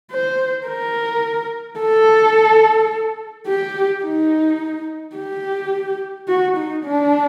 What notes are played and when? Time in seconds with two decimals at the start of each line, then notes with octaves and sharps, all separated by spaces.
0.11 C5
0.67 A#4
1.79 A4
3.47 G4
4.04 D#4
5.16 G4
6.28 F#4
6.57 D#4
6.85 D4